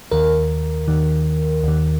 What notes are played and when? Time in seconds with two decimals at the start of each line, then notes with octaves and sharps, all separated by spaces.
0.12 D#2 D#3 A#4
0.88 D#2 D#3
1.64 D#2 D#3